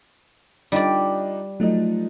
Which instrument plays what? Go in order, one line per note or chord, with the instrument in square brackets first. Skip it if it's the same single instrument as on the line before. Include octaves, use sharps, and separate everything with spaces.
[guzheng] G3 D5 [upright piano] D4 D#4 F4
[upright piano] F3 D#4 [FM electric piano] F#3 A3